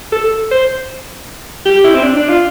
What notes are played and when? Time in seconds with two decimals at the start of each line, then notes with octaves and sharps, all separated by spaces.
0.12 A4
0.51 C5
1.66 G4
1.84 E4
1.95 C4
2.03 D4
2.17 D4
2.29 F4